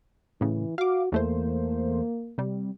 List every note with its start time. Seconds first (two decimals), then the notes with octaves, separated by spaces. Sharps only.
0.41 A2 C#3 E3
0.78 F#4 F5 D6
1.12 E2 A3 A#3 C5
2.38 C3 G3